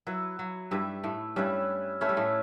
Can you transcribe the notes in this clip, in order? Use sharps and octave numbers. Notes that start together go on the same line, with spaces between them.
F#3 E4 B4 E5
F#3
G2 G3 E4 B4 E5
A2 A3
G2 G3 C#4 E4 B4 E5
A3 C#4 E4 B4 E5
G3
A2 A3